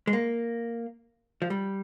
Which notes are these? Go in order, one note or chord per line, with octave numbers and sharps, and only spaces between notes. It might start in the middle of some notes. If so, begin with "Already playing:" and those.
G#3
A#3
F3
G3